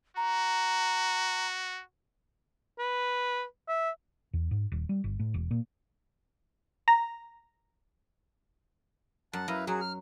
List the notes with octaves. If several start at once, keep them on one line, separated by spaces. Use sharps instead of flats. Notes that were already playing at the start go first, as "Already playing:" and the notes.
F#4 A#5
B4
E5
E2
G#2
D#1
G3
G1
A2
E1
A#2
A#5
F#2 F#5 A5
F#2 E4 B4 D#5 F5
F#3 F#4 G#4
F6